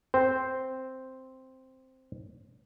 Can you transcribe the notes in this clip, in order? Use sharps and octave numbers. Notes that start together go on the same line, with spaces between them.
C4 C5